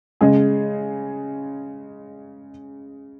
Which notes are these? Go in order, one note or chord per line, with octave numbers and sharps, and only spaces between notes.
C#3 G#3 C#4 G#4